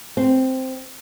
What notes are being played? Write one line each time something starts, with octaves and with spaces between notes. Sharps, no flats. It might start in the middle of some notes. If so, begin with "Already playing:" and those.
C4